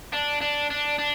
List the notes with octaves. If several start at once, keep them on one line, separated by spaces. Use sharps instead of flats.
D4
D4
D4
D4